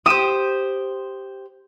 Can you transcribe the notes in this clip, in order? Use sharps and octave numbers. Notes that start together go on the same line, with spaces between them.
G4 C5 D#6 E7